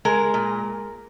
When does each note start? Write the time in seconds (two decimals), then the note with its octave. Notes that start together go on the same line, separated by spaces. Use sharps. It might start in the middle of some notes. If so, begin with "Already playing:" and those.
0.05 G#3 A#4
0.34 A#2